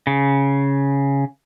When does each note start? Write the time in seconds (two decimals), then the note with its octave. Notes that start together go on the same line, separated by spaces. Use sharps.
0.07 C#3